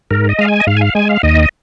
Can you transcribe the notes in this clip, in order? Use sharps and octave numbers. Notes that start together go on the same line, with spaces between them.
G#2 A#4
D#5
G#3 F5
G#5
D#5
G#2 F5
G#5
F5
G#3 G#5
F5
D#2 D#5